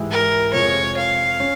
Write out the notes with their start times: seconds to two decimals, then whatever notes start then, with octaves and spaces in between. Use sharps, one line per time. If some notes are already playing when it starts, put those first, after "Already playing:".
Already playing: G#2 E3 G#3 E4 G4
0.11 A#4
0.53 F2 C3 F3 G#3 C#5
0.97 F5
1.40 C#4